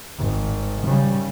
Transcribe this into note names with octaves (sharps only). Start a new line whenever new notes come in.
G#1
C#3 G3